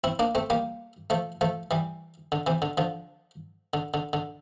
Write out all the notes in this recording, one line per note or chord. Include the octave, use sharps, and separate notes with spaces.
C4 E4
A#3 D4
A3 C4
G3 A#3
F3 A3
F3 A3
E3 G3
D3
C3 E3
D3
D3 F3
D3
D3
D3